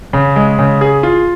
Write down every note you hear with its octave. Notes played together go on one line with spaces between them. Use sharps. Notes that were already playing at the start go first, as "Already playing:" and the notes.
C#3
G#3
C#3
G#4
F4